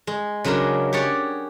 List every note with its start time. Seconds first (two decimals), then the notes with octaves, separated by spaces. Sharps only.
0.07 G#3
0.44 C#3 F#3 G#3 D4 A#4
0.93 G4 G#4 C#5 D5 F#5